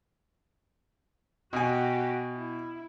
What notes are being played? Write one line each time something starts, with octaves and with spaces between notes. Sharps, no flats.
B2 F#4 G4 G#5
E4